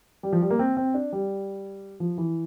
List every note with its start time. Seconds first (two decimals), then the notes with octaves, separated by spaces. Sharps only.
0.23 G3
0.33 F3
0.42 G3
0.50 A#3
0.59 C4
0.77 C4
0.94 D4
1.12 G3
2.00 F3
2.18 E3